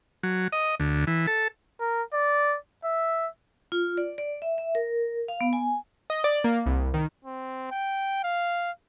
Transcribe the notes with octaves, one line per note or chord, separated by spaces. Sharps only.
F#3
D#5
D2
E3
A4
A#4
D5
E5
F4
D5
D5
E5
E5
A#4
F5
B3
G#5
D#5
D5
A#3
C2
D#3
C4
G5
F5